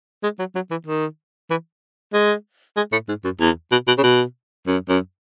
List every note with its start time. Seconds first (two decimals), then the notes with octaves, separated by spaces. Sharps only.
0.23 G#3
0.39 F#3
0.55 F#3
0.71 E3
0.86 D#3
1.50 E3
2.13 G#3
2.76 G#3
2.92 A2
3.08 G#2
3.24 F#2
3.40 E2
3.72 B2
3.87 B2
3.98 C#3
4.03 B2
4.67 F#2
4.89 F#2